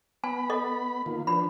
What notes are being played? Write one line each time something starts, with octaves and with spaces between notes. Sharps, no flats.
B3 G#5 B5
A4 D#5
D#3 A#3 F4
F3 D4 B4 B5